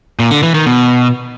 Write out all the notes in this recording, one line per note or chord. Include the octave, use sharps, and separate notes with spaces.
A#2
D3
E3
D#3
B2